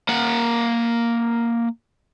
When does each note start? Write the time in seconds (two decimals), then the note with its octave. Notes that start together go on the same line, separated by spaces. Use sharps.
0.09 A#3 F#5